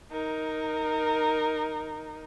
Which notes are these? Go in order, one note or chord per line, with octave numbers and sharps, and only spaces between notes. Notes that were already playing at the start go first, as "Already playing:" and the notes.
D#4 A#4